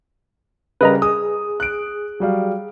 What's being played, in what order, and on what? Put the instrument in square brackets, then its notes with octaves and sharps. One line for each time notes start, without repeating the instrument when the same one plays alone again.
[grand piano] C#3 G3 A#4 [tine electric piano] B4 D#5 A#5
[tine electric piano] G#4 [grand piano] D#6
[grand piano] F#6 D7
F#3 G3 F5